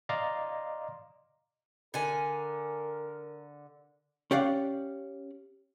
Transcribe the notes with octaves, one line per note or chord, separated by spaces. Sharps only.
D5 D#5 F5 A#5 C6 D6
D3 A#4 G#5
C#4 G4 D5 F5 F#5